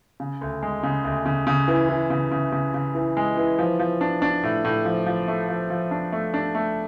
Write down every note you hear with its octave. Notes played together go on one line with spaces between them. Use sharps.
C#3
D2
G#3
C#3
D2
C#3
C#3
E3
E3
C#3
C#3
C#3
C#3
E3
G#3
E3
F3
F3
D4
D4
A2
A2
F3
F3
A3
F3
F3
D4
A3
D4
A3